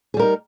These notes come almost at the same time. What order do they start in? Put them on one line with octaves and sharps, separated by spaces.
G#4 G3 A#4 D#4